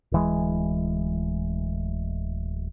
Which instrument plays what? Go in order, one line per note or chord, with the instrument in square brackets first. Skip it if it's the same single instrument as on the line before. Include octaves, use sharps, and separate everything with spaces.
[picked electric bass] D1 E3 G#3